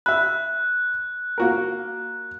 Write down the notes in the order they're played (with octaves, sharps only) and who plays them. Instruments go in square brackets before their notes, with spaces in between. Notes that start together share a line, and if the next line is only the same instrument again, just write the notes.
[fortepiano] E5 B5 [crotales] F#6
[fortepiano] A#3 F#4 A#4